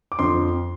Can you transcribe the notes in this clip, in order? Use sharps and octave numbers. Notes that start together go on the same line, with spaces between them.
D6
F2 D3 F3 C6